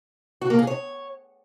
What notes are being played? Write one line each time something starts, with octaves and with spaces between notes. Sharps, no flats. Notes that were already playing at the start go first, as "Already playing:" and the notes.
F#4
A#3
G#4
C#5